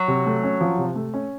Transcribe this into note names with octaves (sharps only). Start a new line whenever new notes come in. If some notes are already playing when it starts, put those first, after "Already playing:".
Already playing: F#3
C3
A3
C#4
F3
C3
A3
C#4